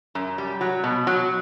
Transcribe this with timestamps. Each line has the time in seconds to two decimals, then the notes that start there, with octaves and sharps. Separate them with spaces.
0.15 F#2
0.38 G3
0.61 F#3
0.84 B2
1.07 F#3